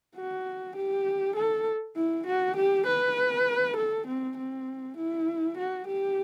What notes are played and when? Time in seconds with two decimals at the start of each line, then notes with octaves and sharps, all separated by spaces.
0.16 F#4
0.76 G4
1.36 A4
1.96 E4
2.26 F#4
2.56 G4
2.86 B4
3.76 A4
4.07 C4
4.37 C4
4.97 E4
5.58 F#4
5.87 G4